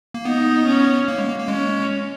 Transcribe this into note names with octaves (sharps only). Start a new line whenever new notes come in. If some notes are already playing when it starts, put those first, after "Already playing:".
A#3
B3 D#4
C#4
A#3
G#3
A#3
A#3
G#3 C#4